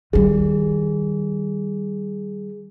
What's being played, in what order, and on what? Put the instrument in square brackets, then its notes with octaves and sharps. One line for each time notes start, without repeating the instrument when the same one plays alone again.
[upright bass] D#3 G3 [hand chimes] G#4